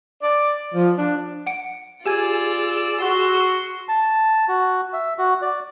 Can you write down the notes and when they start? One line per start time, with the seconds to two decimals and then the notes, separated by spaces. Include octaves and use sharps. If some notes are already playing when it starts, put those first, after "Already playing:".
0.23 D5
0.75 F3
0.98 D4
1.47 F#5 D7
2.06 F4 G4 G#4 D5 G#5 E6 G#6
3.01 F#4 C6
3.89 A5
4.48 F#4
4.93 E5
5.18 F#4
5.42 D5